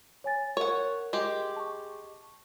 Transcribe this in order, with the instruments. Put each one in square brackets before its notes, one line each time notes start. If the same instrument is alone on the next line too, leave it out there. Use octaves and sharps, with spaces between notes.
[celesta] C#5 G#5 A6
[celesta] A#4 [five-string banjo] C#5 F#5
[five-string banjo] G#3 G4
[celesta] A5 C#6